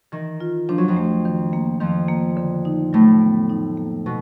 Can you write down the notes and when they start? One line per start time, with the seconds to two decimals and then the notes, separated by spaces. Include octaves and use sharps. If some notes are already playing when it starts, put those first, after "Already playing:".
0.12 D#3 E3
0.40 F4
0.69 F3 D4
0.78 F#3
0.88 F2 F3
0.96 A3
1.25 D#3
1.53 A#3
1.80 F2 D#3 F3
2.09 A#3
2.37 D3
2.65 D#4
2.93 A2 F#3 A3
3.21 B3
3.50 D#4
3.77 A#3
4.06 B2